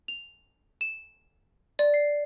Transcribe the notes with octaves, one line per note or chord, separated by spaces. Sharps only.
F7
E7
D5
C7